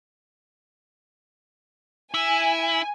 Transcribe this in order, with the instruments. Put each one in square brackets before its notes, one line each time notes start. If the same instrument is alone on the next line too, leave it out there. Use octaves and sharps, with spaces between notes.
[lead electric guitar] E4 [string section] G#5